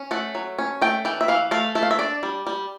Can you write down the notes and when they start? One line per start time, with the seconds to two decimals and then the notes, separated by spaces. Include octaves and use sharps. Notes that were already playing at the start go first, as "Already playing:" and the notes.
Already playing: C#4
0.11 A3 F#5
0.35 F#3
0.59 C#4
0.81 A3 G5
1.05 E3 G5
1.21 E5
1.28 E3 F5
1.51 A3 F5
1.75 A3 E5
1.83 F5
1.91 E5
1.99 D4 D5
2.23 G3
2.47 G3